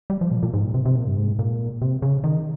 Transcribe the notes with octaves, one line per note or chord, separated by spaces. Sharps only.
G3
F3
A#2
A#2
G#2
A#2
C3
C3
A#2
G2
G#2
A#2
C3
C#3
D#3